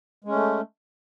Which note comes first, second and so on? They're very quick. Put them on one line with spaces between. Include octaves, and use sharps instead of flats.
G#3 C#4 A3